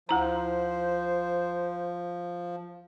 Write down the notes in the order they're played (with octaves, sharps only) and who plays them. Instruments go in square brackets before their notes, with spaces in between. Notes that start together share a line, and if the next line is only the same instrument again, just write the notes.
[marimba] D2 E4 A#5 [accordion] F3 [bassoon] C5